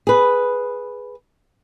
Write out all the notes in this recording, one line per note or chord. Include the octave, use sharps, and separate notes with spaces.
G#4 B4